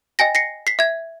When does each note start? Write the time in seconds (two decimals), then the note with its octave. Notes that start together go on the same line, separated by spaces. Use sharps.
0.19 D#5 G5 G#5 A#6
0.35 A#6 C7 C#7
0.67 B6 C7
0.79 E5 G#6